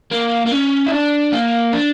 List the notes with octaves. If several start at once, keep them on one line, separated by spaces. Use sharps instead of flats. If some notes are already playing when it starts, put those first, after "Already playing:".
A#3
A#3
C#4
E4
D4
A#3
D4